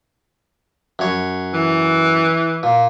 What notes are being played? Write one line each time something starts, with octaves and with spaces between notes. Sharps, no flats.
F#2 C#5
E3
A#2